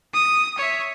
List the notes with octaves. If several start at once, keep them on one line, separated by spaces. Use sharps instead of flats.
D#6
C#5 E5